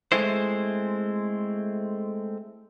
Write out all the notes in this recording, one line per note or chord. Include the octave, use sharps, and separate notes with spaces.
G#3 A3 C4 E4 C5